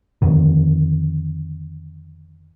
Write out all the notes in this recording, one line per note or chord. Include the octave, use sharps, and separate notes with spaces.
F2 D3 D#3